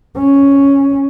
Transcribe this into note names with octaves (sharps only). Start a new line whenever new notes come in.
C#4